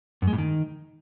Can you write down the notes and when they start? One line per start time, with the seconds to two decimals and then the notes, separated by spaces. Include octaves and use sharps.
0.22 F#2
0.27 G#3
0.33 A2
0.38 D#3